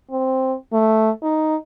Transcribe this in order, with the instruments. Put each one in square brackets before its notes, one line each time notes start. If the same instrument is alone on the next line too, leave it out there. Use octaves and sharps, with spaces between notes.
[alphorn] C4
A3
D#4